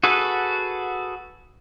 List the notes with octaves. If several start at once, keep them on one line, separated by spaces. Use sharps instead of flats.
F#4 G#4 A4 B4